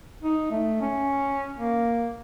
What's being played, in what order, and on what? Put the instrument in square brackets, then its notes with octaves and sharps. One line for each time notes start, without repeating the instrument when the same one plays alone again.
[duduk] D#4
A3
C#4
A#3